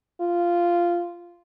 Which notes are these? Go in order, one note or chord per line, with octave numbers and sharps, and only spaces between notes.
F4